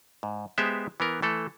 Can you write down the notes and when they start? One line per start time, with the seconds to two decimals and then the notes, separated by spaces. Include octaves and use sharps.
0.23 G#2
0.58 G#3 B3 G4 C5 E5
1.00 E3 B3 A#4
1.22 E3 A3 A4